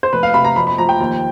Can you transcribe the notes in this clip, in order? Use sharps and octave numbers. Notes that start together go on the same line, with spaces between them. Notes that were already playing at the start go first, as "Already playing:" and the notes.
C5
F1 B4
F5
C3 B5
A#5
F2 B5
B5
F3 A#5
G5
D#2